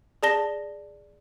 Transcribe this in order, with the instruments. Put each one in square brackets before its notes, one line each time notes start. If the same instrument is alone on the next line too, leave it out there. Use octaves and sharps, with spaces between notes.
[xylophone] G#4 D5 A5 A#6 G7